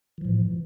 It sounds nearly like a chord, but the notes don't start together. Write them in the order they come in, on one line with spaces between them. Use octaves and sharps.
E3 F3 A2